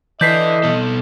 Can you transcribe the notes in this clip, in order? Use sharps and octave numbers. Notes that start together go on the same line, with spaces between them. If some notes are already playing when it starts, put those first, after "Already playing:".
E3 A4 D5 D#5 G6 B6 C7
B2 A4